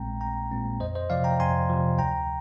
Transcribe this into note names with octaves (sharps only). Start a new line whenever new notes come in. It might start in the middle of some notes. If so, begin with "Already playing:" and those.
Already playing: A#1 A#2 G#3 C4 G5 A#5
A#1 G5 A#5
A#2 G#3 C4
F2 C5 D#5
C5 D#5
C3 F3 D5 F5
G5 A#5
F2 G#5 C6
C3 F3
D2 G5 A#5